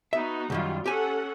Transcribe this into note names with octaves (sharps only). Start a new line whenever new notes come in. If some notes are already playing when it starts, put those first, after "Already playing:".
B3 D#4 F#4 E5
C#2 F#2 D#3 F#3 G3 F4
C#4 G4 A4 F#5 G#5